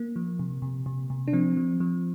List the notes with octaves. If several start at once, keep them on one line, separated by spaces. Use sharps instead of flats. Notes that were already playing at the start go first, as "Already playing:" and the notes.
Already playing: A#3
F3
C3
C3
C3
C3
D4
F3 C4
F3
F3